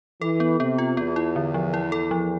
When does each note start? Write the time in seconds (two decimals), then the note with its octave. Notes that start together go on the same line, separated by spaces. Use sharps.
0.21 E3 A4
0.40 B3
0.60 C3 B3
0.78 F4
0.97 E2 B3
1.16 E4
1.36 D3
1.54 F3
1.74 E4
1.92 A4
2.11 F3